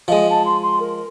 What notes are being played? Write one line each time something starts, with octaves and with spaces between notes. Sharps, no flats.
F3 G#3 D#5
A5
C6
C6
A#4